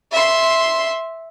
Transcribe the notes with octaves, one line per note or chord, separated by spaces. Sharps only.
E5 C6